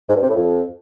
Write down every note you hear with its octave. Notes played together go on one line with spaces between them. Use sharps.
G#2
G2
C3
A2
F2